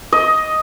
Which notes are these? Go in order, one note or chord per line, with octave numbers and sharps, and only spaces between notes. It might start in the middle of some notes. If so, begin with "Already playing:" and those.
D#5